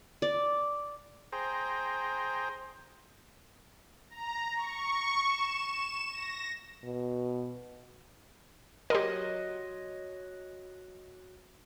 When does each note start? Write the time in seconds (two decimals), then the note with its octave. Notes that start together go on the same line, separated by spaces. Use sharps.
0.22 D5
1.32 G#4 C5 G5 A#5
4.10 A#5
4.56 C#6
5.26 E7
5.69 E7
6.12 A#6
6.84 B2
8.90 F#4 G4 A#4 C#5 D#5 C6